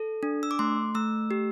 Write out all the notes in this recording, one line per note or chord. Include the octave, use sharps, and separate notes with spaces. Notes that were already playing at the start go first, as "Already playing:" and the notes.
Already playing: A4
D4
E6
D6
A3 C6
A3 E6
G4